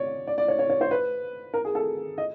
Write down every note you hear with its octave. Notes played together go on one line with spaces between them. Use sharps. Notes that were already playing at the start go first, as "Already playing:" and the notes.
Already playing: C#5 D5
D5
D5
C#5
C#5
C#5
C5
B4
A#4
G#4
A4
D#5